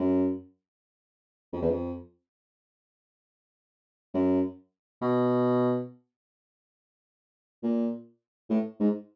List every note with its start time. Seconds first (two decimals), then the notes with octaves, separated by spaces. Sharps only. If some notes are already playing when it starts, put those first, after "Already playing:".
Already playing: F#2
1.53 F2
1.62 E2
1.71 F2
4.14 F#2
5.01 B2
7.63 A#2
8.50 A2
8.80 G#2